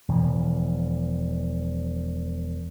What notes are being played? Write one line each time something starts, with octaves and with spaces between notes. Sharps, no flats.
E1 E3 F3